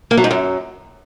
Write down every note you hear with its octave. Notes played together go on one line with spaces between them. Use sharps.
A#3
F#3
G#2
F#2